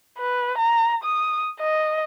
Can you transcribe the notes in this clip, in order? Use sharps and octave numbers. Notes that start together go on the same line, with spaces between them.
B4
A#5
D#6
D#5